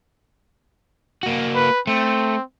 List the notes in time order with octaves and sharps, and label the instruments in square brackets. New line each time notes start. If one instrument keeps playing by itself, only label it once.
[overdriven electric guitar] A#3 F#4
[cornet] B4
[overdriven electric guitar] A3 [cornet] C4